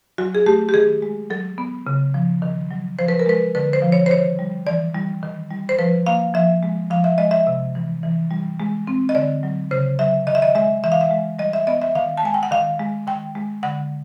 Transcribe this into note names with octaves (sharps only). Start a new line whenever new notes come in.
F#3 F#4
G#4
A3 G4
G4
D#3 G#4
G#3
F#3 A4
B3
C#3
F3
D#3
F#3
F3 C5
B4
A#4
G#3 B4
D3 B4
C5
F3
C#5
C5
D#3 C#5
G3
E3 D5
G3
D#3
G3
C5
F3 B4
A#3 F5
F3 E5
G#3
F3 F5
E5
G#3 D#5
E5
C3
E3
E3
G3
G#3
C4
D#5
D3 D5
F#3
C#3 C5
F#3 E5
D#3 D#5
E5
D#5
G#3 E5
E3 E5
F5
E5
G#3
G3 D#5
E5
B3 D#5
E5
D#3 F5
A5
G#3 G#5
G5
F#5
D#3 F5
G#3
D#3 G5
G#3
D3 F#5